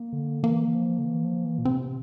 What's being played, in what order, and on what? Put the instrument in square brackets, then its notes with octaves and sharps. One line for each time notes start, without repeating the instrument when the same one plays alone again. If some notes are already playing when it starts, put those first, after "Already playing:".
Already playing: [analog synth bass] A#3
[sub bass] D3
[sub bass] E3 [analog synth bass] A#3
[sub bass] E3
F3
D3
E3
F3
E3
A#2
[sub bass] C3 [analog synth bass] C4